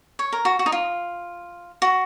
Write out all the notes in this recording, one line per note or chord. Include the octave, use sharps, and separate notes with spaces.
C#5
A#4
F#4
F#4
D#4
F4
F#4